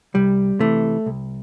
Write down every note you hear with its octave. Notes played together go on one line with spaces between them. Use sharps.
C2 G3
C3 E3 A3
C2